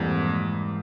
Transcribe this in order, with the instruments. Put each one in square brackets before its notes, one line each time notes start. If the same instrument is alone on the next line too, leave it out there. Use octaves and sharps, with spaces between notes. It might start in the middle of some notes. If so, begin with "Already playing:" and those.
Already playing: [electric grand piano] F2 [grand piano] G#2 E3 G3 A#3